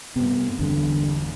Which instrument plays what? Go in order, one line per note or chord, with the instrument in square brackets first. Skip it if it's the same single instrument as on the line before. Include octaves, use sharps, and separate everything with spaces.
[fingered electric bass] G2 C3 [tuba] B3
[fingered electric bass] G1 E2 G2 [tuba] D3